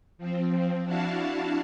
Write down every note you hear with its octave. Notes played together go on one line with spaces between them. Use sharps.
F3 C4
D4 E4 F#4 F5 A5